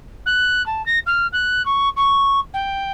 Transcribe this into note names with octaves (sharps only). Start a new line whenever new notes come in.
F#6
A5
A#6
F6
F#6
C#6
C#6
G5